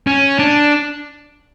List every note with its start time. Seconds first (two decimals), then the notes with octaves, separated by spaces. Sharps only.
0.07 C#4
0.39 D4